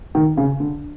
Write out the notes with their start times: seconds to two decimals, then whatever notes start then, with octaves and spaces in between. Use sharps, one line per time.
0.15 D#3
0.37 C#3
0.60 D3